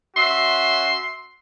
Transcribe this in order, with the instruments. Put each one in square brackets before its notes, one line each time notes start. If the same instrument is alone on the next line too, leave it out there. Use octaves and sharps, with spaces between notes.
[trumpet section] C#4 F#4 E5 [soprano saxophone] C6